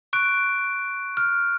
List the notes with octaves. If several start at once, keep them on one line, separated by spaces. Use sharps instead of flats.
C#6 F#6 D7
F6